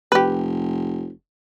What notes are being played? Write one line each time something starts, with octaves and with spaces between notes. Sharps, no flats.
F1 G4 B4